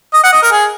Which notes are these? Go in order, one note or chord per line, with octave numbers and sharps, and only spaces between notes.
D#5
F#5
D#5
A#4
G#4